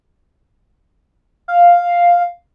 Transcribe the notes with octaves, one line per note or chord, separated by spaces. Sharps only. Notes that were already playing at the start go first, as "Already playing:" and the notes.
F5